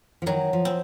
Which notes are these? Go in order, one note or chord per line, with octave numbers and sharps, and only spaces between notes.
F3
D#3 F#3
F3
C4